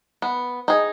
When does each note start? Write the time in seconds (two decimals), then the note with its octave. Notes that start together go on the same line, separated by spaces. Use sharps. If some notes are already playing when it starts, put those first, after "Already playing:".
0.22 B3
0.68 D#4 G#4